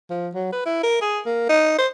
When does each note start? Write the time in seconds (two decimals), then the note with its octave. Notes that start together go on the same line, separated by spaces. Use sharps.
0.10 F3
0.35 F#3
0.53 B4
0.66 E4
0.83 A#4
1.01 G#4
1.26 A#3
1.49 D#4
1.78 C5